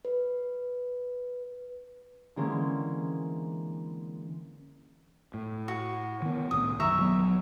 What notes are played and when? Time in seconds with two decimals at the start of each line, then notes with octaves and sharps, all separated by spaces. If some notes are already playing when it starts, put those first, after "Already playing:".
0.05 B4
2.36 D3 E3 G#3 A#3 C4 C#4
5.34 A2
5.68 F#4
6.22 D#3 B3
6.51 C2 A2 D#6
6.80 F#2 D#3 E5 A#5 C#6
7.00 A#1 F#3 B3